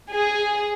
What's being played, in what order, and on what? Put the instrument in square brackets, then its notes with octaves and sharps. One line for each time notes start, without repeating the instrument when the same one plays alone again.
[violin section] G#4